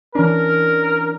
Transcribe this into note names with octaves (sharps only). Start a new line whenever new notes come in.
E3 C#4 D4 A#4